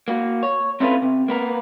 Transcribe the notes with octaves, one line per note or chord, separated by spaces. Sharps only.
A#3 F#4
C#5
C4 C#4 E4 F4 A4 B4
C3
A#3 B3 A#4